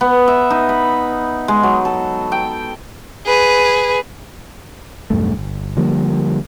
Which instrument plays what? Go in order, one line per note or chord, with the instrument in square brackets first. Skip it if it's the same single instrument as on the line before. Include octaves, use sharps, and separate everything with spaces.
[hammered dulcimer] B3
E5
D#4
B5
G#3
F#3
A4
G5
[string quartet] G#4 B4
[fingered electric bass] B1 E2 G2 A3
G1
D3 F3 G3 A#3